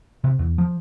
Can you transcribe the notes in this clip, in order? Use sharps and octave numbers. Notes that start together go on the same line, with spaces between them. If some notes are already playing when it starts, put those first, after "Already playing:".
C3
E2
F3